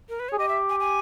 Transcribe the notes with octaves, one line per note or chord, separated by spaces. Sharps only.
A#4
B4
G#4 C#5
G4 D#5
E5
G#5
G#5